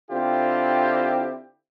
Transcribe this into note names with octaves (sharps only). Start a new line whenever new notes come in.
D3 C4 E4 F4 G4